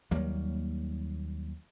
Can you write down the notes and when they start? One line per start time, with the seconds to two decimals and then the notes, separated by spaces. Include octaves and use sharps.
0.11 D#2 F#3 G3 A#3